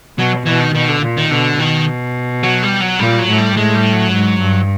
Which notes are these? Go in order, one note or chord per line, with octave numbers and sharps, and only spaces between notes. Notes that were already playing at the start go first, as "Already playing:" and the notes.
B2 F#3
B2 E3
D#3
B2 D#3
D3
A#2
D#3
B2 D3
B2 D#3
F#3
G3
F#3
A#2 G3
F#3
A2
G3
A2 G#3
G3
F#3
G#2
G2